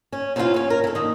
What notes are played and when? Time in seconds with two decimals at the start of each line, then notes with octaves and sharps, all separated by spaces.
0.12 C#4
0.36 C3 E3 A#3 C#4 F4 F5
0.54 E2 C#4
0.70 A#4
0.84 E4 A4
0.95 D#2 D#3